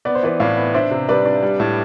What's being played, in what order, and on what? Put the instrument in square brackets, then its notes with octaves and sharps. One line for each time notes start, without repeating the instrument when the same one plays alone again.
[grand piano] B3 [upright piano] D5
[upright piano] C5
[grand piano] E3 [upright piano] B4 D5
[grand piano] A2 [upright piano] D5 F5
[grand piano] B3
[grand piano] D4 [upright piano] C5 E5
[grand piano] C3
[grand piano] G3 [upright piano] B4 D5
[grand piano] D4
G3
A2